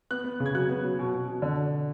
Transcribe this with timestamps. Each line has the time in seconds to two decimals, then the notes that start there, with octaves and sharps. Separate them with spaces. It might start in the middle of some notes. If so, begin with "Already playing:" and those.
0.11 B3 F#6
0.24 B3
0.40 C#3
0.46 G#6
0.54 F#3 F#6
0.69 B3
0.84 F#3
0.99 B2
1.14 B2
1.28 B2
1.42 D3